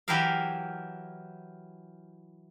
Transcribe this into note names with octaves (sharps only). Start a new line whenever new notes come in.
E3 F#3 E4 G4 A#4 F5